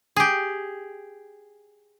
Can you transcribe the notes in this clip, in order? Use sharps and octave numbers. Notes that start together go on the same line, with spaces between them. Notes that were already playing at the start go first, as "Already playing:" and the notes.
G4 G#4